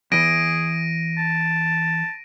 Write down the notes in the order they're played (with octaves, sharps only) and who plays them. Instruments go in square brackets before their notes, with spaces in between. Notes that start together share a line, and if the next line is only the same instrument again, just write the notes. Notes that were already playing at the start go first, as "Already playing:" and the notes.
[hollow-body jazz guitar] E2 E3 [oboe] G#4 [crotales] A#6 D7 D#7
[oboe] A5